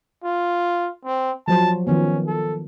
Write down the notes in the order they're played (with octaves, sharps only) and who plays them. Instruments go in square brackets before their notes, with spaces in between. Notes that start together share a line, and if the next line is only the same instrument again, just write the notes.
[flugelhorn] F4
C4
[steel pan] F3 F#3 C5 [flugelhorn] A5
[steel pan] D#3 F3 B3 [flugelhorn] C#4
[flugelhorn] A4